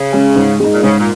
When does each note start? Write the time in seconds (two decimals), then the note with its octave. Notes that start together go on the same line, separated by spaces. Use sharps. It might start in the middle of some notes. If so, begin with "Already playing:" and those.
Already playing: C#3
0.13 G#3 C#4
0.36 G#2
0.60 G#3 D#4
0.73 A#2
0.83 G#2 C#3
0.99 A#2